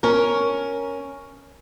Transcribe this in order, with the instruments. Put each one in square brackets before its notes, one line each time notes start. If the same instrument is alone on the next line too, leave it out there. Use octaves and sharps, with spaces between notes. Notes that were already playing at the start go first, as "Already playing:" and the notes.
[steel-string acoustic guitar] C#4 A#4